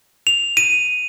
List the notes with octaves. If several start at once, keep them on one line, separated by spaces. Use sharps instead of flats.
F7
D#7